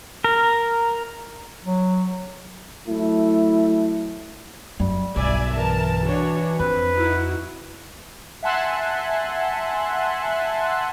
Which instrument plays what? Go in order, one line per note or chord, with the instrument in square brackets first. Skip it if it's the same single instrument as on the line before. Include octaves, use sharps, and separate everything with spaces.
[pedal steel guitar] A#4
[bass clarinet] F#3
[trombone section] F#3 A3 E4
[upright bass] F#2 [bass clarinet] G3
[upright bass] B1 G2 [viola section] D5 E5 G#5
[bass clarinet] E3 [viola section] A#4 A5
[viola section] D4 F#4 C#5
[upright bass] F2 [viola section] C4 [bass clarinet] B4
[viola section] D#4 E4 F#4
[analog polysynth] E5 F#5 G#5 A5 C6 F#6